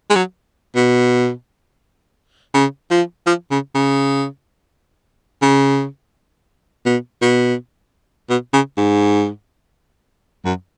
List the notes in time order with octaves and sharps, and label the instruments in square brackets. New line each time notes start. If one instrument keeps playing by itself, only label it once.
[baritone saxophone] G#3
F#3
B2
C#3
F3
F3
C#3
C#3
C#3
B2
B2
B2
C#3
G#2
F#2